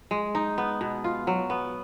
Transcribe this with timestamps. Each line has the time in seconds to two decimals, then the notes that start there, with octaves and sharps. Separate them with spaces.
0.11 G#3
0.35 D#4
0.58 B3
0.81 B2
1.04 F4
1.27 F#3
1.50 B3